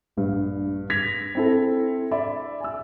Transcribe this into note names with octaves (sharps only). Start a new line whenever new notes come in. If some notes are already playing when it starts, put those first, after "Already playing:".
A#1 G2
G#6 A#6 B6 F7
C4 E4 A4
D5 E5 B5
G#5 E6